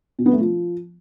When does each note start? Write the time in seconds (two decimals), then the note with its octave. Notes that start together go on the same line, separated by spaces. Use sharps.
0.19 B2
0.26 B3
0.33 A3
0.40 F3